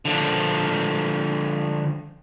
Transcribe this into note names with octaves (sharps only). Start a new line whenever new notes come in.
D3 F3